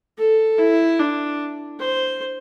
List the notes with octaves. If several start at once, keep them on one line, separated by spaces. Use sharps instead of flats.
A4
E4
D4
C5